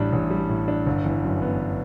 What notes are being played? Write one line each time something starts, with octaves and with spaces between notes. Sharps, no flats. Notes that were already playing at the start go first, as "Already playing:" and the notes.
Already playing: A1 A2 G3 D4
A1
G3
A2
D4
G1
E3
F#2
B3